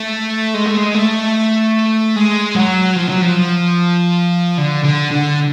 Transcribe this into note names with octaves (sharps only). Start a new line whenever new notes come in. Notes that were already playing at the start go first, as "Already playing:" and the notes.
Already playing: A3
G#3
A3
G#3
A3
G#3
F#3
F3
F#3
F3
D3
D3
D3